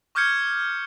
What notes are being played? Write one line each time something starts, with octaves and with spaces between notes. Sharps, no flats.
C#6 D6 F6 G6 G#6 C#7